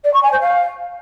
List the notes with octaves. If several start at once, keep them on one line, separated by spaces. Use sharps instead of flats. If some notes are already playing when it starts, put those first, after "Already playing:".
D5
C#6
G#5
C5
F5